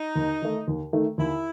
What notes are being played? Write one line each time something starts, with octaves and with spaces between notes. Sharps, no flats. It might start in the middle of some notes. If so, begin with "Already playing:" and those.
Already playing: D#4
D#2
D#3 A3
D#2
D#3 A3
D#2 E4